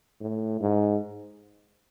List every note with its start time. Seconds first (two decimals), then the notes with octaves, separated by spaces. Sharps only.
0.20 A2
0.61 G#2